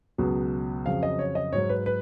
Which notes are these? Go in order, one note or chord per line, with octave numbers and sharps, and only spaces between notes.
C#2 B2 F#3
F2 C#3 F#3 F5
D#5
C#5
D#5
G#2 F#3 C#5
B4
B4